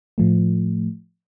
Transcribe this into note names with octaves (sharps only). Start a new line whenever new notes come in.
A2 F3 A3